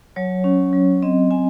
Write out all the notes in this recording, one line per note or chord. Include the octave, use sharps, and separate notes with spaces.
F#3 C#5
C#4
F#3
C4 D#5
C4 G#5